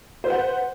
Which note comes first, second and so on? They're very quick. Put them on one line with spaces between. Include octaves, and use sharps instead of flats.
C5 B4 F#5